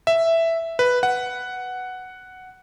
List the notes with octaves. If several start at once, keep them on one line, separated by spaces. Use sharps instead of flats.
E5
B4
F#5